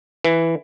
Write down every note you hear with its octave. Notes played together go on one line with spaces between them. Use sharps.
E3